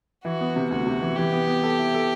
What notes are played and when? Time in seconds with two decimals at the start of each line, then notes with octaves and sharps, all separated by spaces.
0.25 E3 F#4
0.41 B3
0.56 C3
0.71 D2 F#4
0.87 C3
1.02 E3
1.17 E3 G4
1.32 B3
1.48 B3
1.63 A4
1.78 E4
1.94 A4